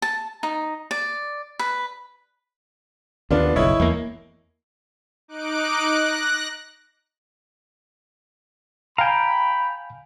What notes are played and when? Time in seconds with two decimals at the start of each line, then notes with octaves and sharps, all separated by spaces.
0.02 A5
0.43 D#4
0.91 D5
1.59 B4
3.31 D#2 D3 B3 D4 F4
3.56 F#1 B1 E4 C#5 D#5
3.80 E2 A#3
5.28 D#4 D6 F#6 D7
5.86 F#6 A#6
8.98 F5 G5 G#5 A#5 B5